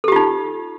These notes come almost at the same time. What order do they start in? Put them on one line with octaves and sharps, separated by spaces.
A4 G4 F4 D#4